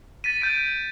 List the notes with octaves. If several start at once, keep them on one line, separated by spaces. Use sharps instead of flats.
A6 B6 D#7
G6 A6 D7